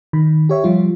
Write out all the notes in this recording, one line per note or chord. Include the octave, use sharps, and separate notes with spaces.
D#3 B5
G4 C#5 E5
F3 G3 F4